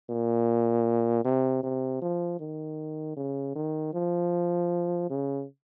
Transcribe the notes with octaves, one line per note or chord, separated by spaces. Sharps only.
A#2
C3
C3
F3
D#3
C#3
D#3
F3
C#3